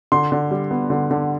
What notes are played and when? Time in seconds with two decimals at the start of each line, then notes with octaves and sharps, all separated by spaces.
0.12 D3 C6
0.32 D3
0.51 G3
0.71 B3
0.90 D3
1.11 D3